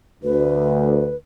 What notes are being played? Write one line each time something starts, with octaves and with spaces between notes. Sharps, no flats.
D2 B4